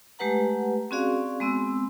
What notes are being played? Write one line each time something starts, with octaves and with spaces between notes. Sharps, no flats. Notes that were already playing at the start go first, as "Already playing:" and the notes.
G#3 A3 G4 B4 F#5 A#5
C4 C#4 F#4 G#4 D5 F5
G#3 B3 C4 E6